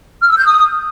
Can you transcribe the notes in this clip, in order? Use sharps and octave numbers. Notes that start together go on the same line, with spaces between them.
F6
E6
G6
D#6